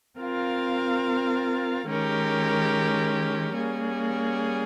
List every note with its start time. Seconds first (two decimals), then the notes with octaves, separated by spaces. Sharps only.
0.18 C4 F4 A#4 F5
1.86 D#3 G#3 C#4 G4 A#4
3.53 G3 A#3 C#4 G#4